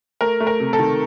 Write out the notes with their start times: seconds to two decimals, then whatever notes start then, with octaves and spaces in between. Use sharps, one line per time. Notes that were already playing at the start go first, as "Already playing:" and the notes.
0.21 A3 A#4
0.40 A3
0.47 A#4
0.60 C3
0.73 A4
0.79 D#3